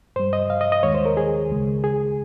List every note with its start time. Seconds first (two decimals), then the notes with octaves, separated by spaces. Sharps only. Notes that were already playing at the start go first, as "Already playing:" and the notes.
0.16 G2 G3 C5
0.33 D#5
0.50 F5
0.61 D#5
0.72 D#5
0.83 D#2 D#3 G#3 C#5
0.94 C5
1.06 A#4
1.17 G#4
1.50 C#2 C#3 G#3
1.84 G#4